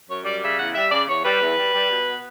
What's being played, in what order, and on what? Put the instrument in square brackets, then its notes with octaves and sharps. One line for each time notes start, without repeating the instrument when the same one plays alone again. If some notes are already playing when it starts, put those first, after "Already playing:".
[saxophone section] F#2 C#5
G3 D5
C#3 E5
E2 F#5
G3 E5
C#3 D5
E2 C#5
G3 B4
E2
G3
G3
B2
B3